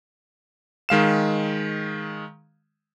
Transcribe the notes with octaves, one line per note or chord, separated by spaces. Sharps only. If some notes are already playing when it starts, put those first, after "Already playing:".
D#3 G#3 F5 E7